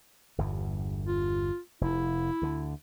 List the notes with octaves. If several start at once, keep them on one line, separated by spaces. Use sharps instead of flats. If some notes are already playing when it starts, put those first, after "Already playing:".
G1 E2 G2
F4
F1 C3 E4
D2 D3